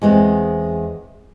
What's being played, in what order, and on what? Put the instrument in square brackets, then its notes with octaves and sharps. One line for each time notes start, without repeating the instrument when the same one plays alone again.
[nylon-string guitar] E2 G#3 B3 C4